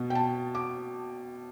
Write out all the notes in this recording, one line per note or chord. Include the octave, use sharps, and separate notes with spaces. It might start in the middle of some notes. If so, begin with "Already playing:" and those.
Already playing: B2 B3
G5
A5
D6